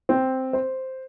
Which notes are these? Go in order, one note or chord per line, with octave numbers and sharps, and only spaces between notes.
C4
C5